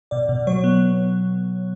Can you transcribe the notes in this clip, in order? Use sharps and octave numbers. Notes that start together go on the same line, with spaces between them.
B2 D5
B2
F#3 C#5
B3